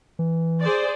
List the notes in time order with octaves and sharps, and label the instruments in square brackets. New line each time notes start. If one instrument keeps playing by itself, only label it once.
[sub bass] E3
[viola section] G#4 C5 D5